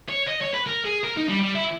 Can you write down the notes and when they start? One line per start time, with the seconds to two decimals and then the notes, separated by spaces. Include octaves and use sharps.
0.09 C#5
0.28 D#5
0.42 C#5
0.54 B4
0.66 A#4
0.85 G#4
1.04 A#4
1.17 D#4
1.29 G3
1.43 G3
1.55 E4